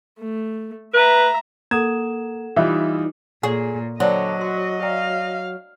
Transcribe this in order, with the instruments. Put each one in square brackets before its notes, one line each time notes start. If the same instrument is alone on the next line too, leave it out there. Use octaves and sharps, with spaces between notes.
[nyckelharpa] A3
[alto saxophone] B4 [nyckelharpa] E5 A#5
[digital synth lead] A#3 [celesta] A4 F#5 E7 [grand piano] D#6 G#6
[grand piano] E3 G3 F4 [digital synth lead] D#4 [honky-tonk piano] E5
[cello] A#2 [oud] G#4 [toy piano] C#5 C#6
[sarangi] D3 [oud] F#3 [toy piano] C5 D5 G5 [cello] D#5
[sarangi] F#4 [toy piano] C6
[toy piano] D5 G5 A#5 [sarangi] F5